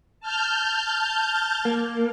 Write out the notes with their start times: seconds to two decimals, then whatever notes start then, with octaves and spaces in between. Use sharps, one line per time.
0.20 A5 F6 G6
1.65 A#3